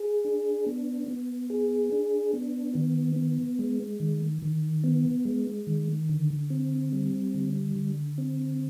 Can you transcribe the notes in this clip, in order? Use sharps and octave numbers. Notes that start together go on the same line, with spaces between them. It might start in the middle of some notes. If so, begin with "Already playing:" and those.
Already playing: G#4
D4
B3
B3
G#4
D4
B3
D#3
B3
G#3
D#3
D#3
B3
G#3
D#3
D3
C4
G3
D3
D3
C4